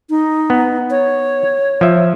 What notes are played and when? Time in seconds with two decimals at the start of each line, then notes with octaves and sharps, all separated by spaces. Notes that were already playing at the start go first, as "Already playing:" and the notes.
0.10 D#4
0.50 B3
0.90 C#5
1.81 F3 E5